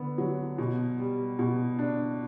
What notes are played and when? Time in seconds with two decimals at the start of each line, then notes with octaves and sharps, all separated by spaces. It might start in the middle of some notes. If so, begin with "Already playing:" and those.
Already playing: D3 B3
0.18 F#3
0.58 B2
0.98 G3
1.39 B2
1.79 D4